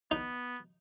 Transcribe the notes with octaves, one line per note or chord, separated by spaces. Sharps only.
B3 D#4